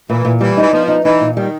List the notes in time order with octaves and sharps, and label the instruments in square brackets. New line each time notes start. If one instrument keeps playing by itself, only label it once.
[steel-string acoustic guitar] A#2 [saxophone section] E3
[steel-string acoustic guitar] A#2
[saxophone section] E3 [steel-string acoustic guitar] G3
[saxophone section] E3 [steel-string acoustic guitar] D#4
[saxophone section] F3 [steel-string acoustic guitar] B3
[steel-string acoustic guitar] D#4
[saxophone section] E3 [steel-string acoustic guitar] D#4
[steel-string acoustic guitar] A#2
[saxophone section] D#3 [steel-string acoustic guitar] G3